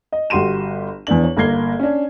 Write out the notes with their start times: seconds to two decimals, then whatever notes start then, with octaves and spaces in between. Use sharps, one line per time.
0.12 D#5
0.30 G1 F#4 G4 C6 D#7 E7
1.07 E2 B3 D4 F#7
1.24 C#5
1.37 G1 A#3 A#4 G#6 C7 G7
1.80 C#4 D4